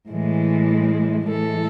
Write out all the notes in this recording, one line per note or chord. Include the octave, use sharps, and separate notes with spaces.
A2 E3 G#3
A2 E3 G#3 A4